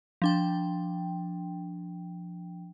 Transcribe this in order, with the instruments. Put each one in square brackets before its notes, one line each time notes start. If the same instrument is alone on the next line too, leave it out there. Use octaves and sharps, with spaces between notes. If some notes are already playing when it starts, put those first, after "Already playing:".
[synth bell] F3 D4 G5